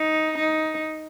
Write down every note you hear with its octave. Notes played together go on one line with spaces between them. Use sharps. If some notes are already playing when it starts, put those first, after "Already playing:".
Already playing: D#4
D#4